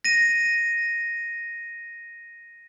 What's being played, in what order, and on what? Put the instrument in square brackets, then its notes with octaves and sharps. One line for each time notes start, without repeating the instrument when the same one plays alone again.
[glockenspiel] A#6 D#7